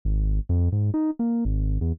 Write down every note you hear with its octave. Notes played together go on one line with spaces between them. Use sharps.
G#1
F2
G#2
D#4
A#3
G#1
E2